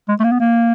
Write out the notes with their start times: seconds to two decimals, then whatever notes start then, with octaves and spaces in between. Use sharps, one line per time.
0.09 G#3
0.20 A3
0.24 A#3
0.32 B3
0.40 A#3